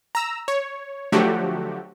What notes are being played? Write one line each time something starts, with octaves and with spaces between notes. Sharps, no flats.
A#5 E6
C#5
D3 F3 F#3 A3 F#4 G4